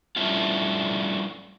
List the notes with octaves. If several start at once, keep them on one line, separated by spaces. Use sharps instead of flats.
G3 A3 C#4 D4 E4 F4